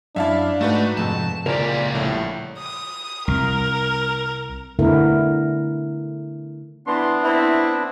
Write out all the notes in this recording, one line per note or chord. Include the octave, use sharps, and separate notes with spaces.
F#2 D4 E4 E5 F5 A5
G#2 A3 D#4 F#4 B4
F2 G#2 C3 A5
C#2 A#2 G3 G#3 A#3 A#4 D5
A#1 A2
D#6
C2 A#4
D3 A3 B3 E4 A#4
E3 B3 D4 C6
C4 E4